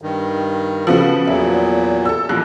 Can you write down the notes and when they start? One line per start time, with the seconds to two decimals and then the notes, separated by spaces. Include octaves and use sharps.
0.02 G2 D#3
0.87 C#3 F3 B3 F#4 A4 B4
1.27 E2 A#2 F#3 E5
2.05 A4 E6
2.29 A1 F2 A#2 F#6